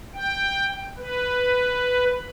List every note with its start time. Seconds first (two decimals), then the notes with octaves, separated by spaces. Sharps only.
0.14 G5
0.98 B4